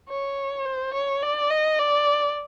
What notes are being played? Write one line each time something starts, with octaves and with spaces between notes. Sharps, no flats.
C#5
C5
C#5
D5
D#5
D5